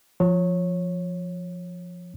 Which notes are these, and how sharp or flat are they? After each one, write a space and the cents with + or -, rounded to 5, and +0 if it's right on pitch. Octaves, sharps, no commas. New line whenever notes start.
F3 +0 C#5 -15